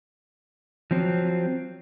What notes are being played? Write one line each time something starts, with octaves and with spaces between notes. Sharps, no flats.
F3 F#3 C4